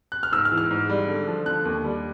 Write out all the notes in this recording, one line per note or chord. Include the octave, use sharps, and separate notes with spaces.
F#6
F6
G#2 E6
F6
E3
F6
G#2
G3
D3
F3
D3 F#6
D#2
G3